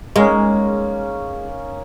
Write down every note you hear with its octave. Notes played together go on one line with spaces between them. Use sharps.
G#3 A#3 C#4 D#4